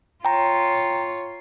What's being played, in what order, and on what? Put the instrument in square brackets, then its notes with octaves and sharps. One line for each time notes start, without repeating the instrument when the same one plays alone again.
[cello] F4 C#5 [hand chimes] G5 A#5